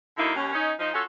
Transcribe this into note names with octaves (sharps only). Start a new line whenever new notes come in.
D3 F#3 A#3 D#4 E4
D#2 C#4
C#4 D#4
F3 D#4
C#4 F4 F#4 A4